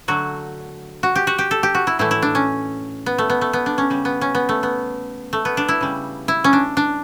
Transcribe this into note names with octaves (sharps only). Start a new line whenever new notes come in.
D3 F#3 A3 F#4
F#4
G4
F#4
G4
A4
G4
F#4
E4
A2 E3 A3 E4
E4
D4
C#4
B3
A3
B3
A3
B3
D4
C#4
C#3 G3
B3
C#4
B3
A3
B3
A3
B3
D4
E4
C#3 G3
E4
C#4
D4
D4